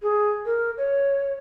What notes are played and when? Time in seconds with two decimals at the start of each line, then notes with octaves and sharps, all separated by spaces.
0.02 G#4
0.46 A#4
0.77 C#5